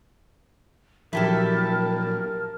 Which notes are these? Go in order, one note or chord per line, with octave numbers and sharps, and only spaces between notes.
A#2 F3 F#3 E4 G4 A4 A#4 A5